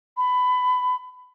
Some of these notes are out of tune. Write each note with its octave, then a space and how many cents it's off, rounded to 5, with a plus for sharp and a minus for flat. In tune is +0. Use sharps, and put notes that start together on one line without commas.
B5 +20